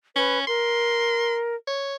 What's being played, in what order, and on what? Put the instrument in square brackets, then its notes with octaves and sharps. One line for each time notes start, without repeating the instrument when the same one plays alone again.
[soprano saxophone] C#4 [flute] B4
[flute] A#4 [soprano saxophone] C6
[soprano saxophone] C#5